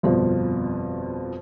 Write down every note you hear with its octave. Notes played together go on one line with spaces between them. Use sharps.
G1 F2 B2 F3